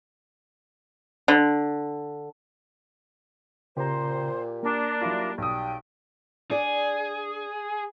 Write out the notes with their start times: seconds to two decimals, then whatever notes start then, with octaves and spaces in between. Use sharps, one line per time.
1.28 D3
3.77 A#2 C#3 G4 C5 A#5
4.63 A#3 D4 A#4
5.01 F#3 G3 E4 F4
5.38 B1 G5 D#6
6.51 D4 G#4 D5